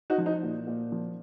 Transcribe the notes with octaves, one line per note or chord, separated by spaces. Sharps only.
D#4 F#4
F3
D#4
A#2
A#2
F3